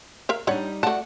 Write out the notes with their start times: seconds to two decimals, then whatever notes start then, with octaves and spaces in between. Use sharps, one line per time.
0.29 A#4 E5 F5
0.47 G3 D4 D#4 C#5 F#5
0.83 A3 F#4 D5 F#5 A5